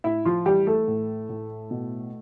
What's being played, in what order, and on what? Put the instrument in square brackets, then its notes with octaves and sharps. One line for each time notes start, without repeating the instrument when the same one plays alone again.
[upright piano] A2 E4 E5
F3 F4
E3 G3 G4
A3 A4
A2
A2
B2